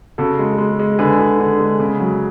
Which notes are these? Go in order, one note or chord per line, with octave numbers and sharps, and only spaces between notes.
C#3 F#4 A4
G#3
G#3
G#3
D3 G#4 B4
D3
D3
G#3
C#3
F#3